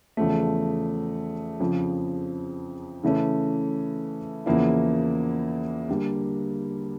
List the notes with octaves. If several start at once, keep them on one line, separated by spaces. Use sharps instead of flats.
E2 C#3 F3 A3
F2 C#3 F3
C#3 E3 A3 C#4
E2 C#3 F3 A#3 E4
D3 G3 A#3